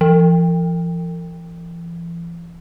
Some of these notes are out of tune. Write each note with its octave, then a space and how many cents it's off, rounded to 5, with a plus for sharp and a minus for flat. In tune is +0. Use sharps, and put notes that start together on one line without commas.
E3 +45